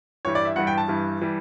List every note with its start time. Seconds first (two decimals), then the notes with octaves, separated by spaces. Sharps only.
0.25 G2 E3 G3 C#5
0.35 D5
0.45 E5
0.56 G2 E3 G3 F#5
0.67 G5
0.78 A5
0.88 G2 E3 G3
1.21 E3 G3